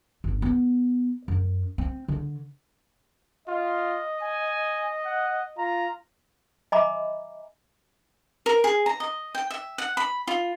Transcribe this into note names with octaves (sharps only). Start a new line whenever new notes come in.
G1
B3
F#2
C4
D3
F4 D#5
G#5
F#5
F4 A#5
D#5 E5 G#5 A#5 B5 D6
A#4
G#4
A#5
D#5
G5
E5
F#5
B5
F4